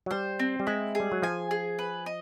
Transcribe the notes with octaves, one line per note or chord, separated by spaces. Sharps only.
F#3
G3 C5
C4
G3
G#3 E4
G#4
G3
F#3
F3 G#5
G#4
B4
D#5